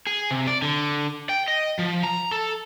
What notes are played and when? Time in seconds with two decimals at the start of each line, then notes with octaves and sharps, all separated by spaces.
0.07 G#4
0.31 C3
0.47 D5
0.62 D3
1.29 G5
1.48 D#5
1.79 F3
2.03 A#5
2.31 A4